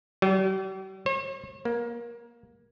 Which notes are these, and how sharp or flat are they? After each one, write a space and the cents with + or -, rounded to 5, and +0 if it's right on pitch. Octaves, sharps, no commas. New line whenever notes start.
G3 -45
C#5 -45
A#3 +20